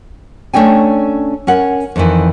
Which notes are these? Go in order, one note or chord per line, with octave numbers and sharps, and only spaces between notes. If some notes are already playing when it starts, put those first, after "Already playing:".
A3 C#4 D4 G5 G#5
C#4 A#4 F#5
F2 D#3 E3